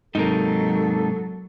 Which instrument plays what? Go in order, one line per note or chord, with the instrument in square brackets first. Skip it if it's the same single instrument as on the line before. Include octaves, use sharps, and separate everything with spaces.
[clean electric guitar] G#2 C3 A#3 [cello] F#3 [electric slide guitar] D#4 A#4 [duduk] A4